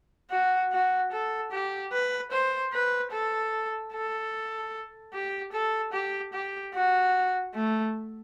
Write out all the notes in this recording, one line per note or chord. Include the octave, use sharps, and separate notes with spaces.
F#4
F#4
A4
G4
B4
C5
B4
A4
A4
G4
A4
G4
G4
F#4
A3